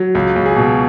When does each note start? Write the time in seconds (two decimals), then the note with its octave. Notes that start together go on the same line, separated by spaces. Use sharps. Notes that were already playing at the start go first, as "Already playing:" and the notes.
Already playing: F#3
0.15 C#2
0.36 C#2
0.46 G#4
0.56 B2